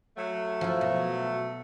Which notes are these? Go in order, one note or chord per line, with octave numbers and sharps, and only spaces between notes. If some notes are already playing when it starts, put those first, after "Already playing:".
F#3 A3
F3 E4
B2